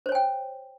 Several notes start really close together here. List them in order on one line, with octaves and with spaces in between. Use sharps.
C5 C#5 G#5 G5